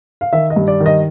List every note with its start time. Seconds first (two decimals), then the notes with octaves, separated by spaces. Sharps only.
0.21 F5
0.33 D#3 E5
0.50 D#5
0.56 G2
0.68 D5
0.80 D#3
0.86 D#5